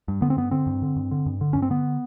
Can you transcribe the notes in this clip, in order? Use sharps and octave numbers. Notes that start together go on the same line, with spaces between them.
G2
D3 B3
C4
G2 B3
D3 C4
G2
D3
G2
D3
G2
D3
G2 C#4
C4
D3 B3